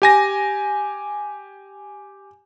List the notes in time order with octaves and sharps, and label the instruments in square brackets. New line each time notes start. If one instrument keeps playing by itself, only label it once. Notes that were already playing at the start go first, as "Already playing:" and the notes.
[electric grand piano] G4 G#5 A#6